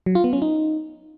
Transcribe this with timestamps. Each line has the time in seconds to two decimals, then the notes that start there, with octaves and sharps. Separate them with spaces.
0.06 F#3
0.15 F4
0.24 B3
0.33 C#4
0.42 D#4